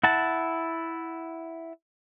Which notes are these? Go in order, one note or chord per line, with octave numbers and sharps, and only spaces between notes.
E4 F#5 A5